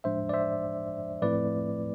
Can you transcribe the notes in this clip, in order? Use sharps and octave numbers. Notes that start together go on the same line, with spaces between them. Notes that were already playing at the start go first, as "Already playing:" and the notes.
A2 F3 G#3 D4 C5 E5
D5
C5 E5
A2 F3 A3 C4 E4 B4 D5